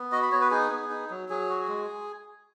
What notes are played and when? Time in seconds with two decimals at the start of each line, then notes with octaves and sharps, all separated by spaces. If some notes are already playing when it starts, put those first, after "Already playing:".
Already playing: B3
0.12 F#4 D#5
0.23 B5
0.32 B3 C#5
0.41 B4
0.51 D#4 G#4
0.71 B3
0.90 D#4
1.10 F#3
1.29 F#3 G#4
1.49 F#4
1.68 G#3